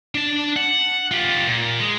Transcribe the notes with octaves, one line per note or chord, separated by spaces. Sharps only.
D4 A5
F#5
F4 G4
A#2
G#3